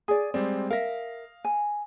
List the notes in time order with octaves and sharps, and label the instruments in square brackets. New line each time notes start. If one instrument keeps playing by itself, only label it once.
[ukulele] G#4 D5 [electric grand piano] G#5 D#6
[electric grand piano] G3 G#3 C4 [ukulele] D5
[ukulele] A#4 E5 [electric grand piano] F5 A#6
[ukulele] G#5